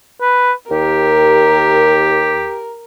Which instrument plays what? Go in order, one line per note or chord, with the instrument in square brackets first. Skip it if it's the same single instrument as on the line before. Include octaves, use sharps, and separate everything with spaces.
[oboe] B4
[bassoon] D#2 [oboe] G4 [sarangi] A#4